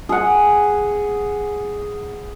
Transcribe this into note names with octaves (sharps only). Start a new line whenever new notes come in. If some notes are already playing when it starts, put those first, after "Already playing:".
G#4 F#5